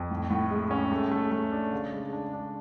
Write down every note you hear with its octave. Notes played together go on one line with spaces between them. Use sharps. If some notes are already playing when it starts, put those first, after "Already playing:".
Already playing: F2
A2
A2
G#3
C#4
A3
A3
A3
D4
C#3
G#3
D4
D4